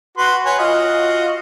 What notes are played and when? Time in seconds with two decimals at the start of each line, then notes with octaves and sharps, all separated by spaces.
0.18 F#4 B4 C6
0.45 B4 C#5 G#5
0.59 F4 F#4 D#5